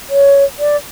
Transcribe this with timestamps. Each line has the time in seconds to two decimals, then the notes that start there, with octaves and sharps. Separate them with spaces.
0.10 C#5
0.59 D5